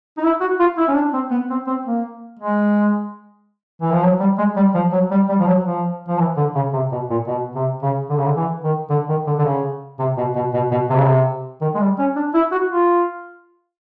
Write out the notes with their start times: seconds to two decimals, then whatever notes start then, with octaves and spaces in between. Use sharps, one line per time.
0.17 D#4
0.23 E4
0.41 F#4
0.60 F4
0.77 E4
0.88 C#4
0.95 D4
1.13 C4
1.31 B3
1.50 C4
1.67 C4
1.86 A#3
2.39 G#3
3.81 E3
3.92 F3
4.03 F#3
4.20 G3
4.38 G#3
4.56 G3
4.75 F3
4.92 F#3
5.11 G3
5.29 G3
5.40 F3
5.47 F#3
5.65 F3
6.08 F3
6.19 E3
6.37 D3
6.55 C#3
6.73 C3
6.92 B2
7.10 A#2
7.27 B2
7.55 C3
7.82 C#3
8.10 D3
8.17 C#3
8.26 D3
8.36 E3
8.64 D#3
8.90 D3
9.09 D#3
9.27 D3
9.38 D3
9.45 C#3
9.99 C3
10.17 B2
10.35 B2
10.54 B2
10.71 B2
10.90 C3
10.96 C#3
11.04 C3
11.61 D#3
11.74 G#3
11.80 G3
11.98 C#4
12.16 D4
12.34 E4
12.52 F#4
12.71 F4